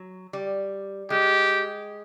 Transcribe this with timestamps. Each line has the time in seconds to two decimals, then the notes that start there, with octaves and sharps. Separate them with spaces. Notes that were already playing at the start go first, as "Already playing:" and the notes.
Already playing: F#3
0.33 G3
1.10 G#3 G4